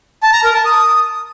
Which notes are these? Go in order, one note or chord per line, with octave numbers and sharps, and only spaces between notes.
A5
A#5
A#4
A5
D#6